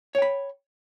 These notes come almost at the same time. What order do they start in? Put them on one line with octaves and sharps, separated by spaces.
C#5 G5 B5